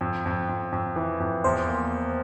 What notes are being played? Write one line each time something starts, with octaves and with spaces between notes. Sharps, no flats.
F2
F2
F2
F2
E3
F2
E2 C5
A#3